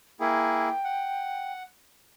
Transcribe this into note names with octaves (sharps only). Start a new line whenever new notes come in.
A#3 E4 G#4 G5
F#5